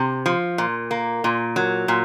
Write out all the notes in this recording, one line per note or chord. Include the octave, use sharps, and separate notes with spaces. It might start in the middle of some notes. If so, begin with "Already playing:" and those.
Already playing: C3
F3
A#2
A#3
A#2
F#3
A#2